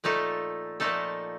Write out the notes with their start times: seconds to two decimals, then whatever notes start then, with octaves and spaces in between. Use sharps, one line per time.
0.04 A#2 F3 A3 D#4 A4
0.80 A#2 F3 A3 D#4 A4